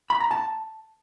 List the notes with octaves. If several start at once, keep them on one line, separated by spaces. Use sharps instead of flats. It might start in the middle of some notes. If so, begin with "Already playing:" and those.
B5
A#5
A5